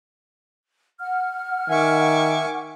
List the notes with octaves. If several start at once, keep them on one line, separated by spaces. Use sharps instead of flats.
F#5 F6
D#3 E5 G#5 C#6 D6